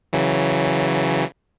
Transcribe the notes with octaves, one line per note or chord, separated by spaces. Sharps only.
C#3 E3 F#3